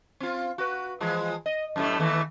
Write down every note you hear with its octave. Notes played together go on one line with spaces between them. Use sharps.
C4 F4
F#4 B4
E3 F3 G#3
D#5
F#2 A2 A3
D#2 E3 A3